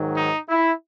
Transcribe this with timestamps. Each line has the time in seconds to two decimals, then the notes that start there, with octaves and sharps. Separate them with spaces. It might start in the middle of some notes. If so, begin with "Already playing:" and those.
Already playing: G#2 D#3 F#3
0.17 D#4
0.49 E4